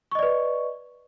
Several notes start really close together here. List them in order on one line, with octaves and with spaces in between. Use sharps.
C#6 D#5 D5 B4